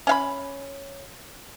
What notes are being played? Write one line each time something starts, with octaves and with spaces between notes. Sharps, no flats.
C#4 F5 B5